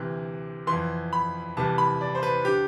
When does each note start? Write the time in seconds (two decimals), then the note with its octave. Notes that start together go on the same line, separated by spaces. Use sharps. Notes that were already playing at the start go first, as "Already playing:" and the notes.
Already playing: D2 C3 E3
0.67 E3 C6
0.72 F2
1.13 B5
1.57 C2 C3 E3 A5
1.78 B5
2.01 D5
2.15 C5
2.23 B4
2.45 D3 G4